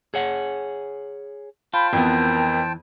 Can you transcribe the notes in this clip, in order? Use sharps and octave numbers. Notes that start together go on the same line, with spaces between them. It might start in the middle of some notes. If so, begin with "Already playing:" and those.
G#4 C#5 F#5
F4 C5 G5 A5 B5
F2 E3 B3 A#4